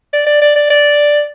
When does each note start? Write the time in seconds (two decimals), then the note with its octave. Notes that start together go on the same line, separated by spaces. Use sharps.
0.13 D5
0.27 D5
0.42 D5
0.56 D5
0.70 D5